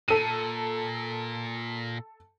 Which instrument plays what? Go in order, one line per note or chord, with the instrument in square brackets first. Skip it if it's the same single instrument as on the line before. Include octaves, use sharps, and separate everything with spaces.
[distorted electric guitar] A#2 [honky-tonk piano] A4 D#7